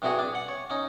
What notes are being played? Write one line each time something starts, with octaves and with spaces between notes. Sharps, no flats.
G2 C3 E4 F#4 G#4
D4
F#5
C#5
C#4 D#4